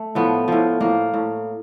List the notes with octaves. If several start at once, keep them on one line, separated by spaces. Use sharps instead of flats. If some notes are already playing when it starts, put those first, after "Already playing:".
Already playing: A3
A2 F3 B3
A2 F3
A2 F3 A#3
A2